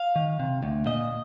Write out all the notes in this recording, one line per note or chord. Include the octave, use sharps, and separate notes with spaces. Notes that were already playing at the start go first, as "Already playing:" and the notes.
Already playing: F5
D#3
C3
D2
A#2 D#5